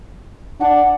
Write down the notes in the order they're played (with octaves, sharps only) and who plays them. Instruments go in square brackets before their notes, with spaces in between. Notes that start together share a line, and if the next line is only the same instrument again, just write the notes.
[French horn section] D4 [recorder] F#5